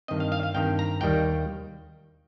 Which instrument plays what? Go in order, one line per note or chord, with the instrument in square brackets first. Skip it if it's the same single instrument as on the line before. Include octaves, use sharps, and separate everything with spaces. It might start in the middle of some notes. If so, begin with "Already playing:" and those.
[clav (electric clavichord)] G2 D#3 C4 D#5
F5
F5
F5
G2 D#3 C4 G5
A#5
D#2 D#3 G3 A#3 G5